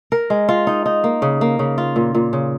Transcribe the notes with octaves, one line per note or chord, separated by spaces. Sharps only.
A#4
G#3
F4
D#4
D#4
A#3
C#3
A#3
C#3
F4
A#2
A#2
C#3